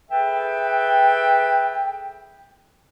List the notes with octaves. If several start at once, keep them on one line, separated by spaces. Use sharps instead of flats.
G#4 A4 B4 E5 G5